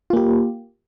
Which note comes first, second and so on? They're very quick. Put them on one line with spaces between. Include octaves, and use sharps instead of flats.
F4 A#3 G4